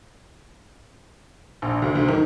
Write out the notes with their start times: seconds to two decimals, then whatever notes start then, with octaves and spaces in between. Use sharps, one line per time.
1.62 A#1
1.82 D2
1.95 D2
2.09 D#3